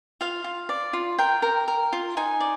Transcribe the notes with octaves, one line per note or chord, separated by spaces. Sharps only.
F4 F5
F4
D5
F4
A#4 G5
A#4
A#4
F4
D#4 G#5
D5